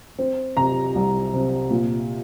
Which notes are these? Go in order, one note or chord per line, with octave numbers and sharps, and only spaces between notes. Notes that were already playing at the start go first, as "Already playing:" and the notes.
C4
C3 A#5
C2
C3
A#2